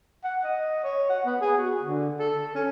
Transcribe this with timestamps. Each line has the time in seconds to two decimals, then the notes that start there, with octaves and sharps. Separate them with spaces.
0.24 F#5
0.44 D#5
0.84 C#5
1.09 F#5
1.26 B3
1.41 G#4
1.58 F#4
1.83 D3
2.19 A4
2.55 C#4